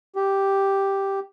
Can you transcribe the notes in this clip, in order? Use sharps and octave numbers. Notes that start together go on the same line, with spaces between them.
G4